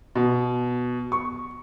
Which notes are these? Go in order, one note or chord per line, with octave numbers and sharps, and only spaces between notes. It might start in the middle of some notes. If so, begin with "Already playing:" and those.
B2
C#6